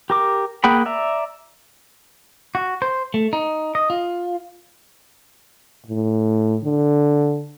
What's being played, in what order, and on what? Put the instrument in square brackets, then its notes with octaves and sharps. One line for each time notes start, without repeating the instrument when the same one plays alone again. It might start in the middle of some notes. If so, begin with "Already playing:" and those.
[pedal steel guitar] G4 A#4 D6
A#3 G#4 F#5 G5 B5
D5 E5 A#5
[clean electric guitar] F#4
C5
A3
D#4
D#5
F4
[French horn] A2
D3